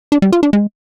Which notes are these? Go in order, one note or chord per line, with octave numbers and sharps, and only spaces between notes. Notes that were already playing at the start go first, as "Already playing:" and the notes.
D4
G3
F4
D4
G#3